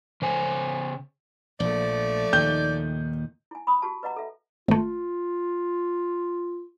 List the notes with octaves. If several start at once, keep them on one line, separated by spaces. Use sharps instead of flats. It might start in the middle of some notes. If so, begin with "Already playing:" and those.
C#3 C5 G#5
A#1 F3 A3 D5
D#2 A#2 D#3 G6
E4 G#5
B5 D#6
F#4 G4 A5
B4 D#5 F#5 A#5
A4 E5
G#1 A3 F4